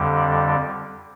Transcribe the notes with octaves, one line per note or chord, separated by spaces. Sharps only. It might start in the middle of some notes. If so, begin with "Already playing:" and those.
Already playing: F2 D3 G3